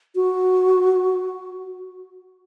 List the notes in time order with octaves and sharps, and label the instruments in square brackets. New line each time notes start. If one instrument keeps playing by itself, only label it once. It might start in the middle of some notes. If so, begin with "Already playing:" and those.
[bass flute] F#4